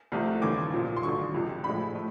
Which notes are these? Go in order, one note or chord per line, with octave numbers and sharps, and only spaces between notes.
C2 C3 F3 A3
D#2 C#3 E3 G3 D6
B1 A#2 F3
C6
G#1 G2 D3 F#3 C#6
C#2 C3 F3 G#3
A#1 A2 F3 G#3 B5
A3